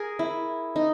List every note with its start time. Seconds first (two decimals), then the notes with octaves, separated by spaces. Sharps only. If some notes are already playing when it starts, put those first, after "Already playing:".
Already playing: G#4 A#4
0.19 E4
0.76 D#4